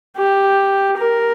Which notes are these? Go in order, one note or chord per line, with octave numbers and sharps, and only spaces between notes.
G4
A#4